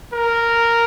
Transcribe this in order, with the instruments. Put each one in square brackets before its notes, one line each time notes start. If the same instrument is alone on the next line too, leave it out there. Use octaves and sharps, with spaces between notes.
[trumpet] A#4